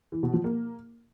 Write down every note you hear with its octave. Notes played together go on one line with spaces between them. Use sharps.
E3
B2
F3
A#3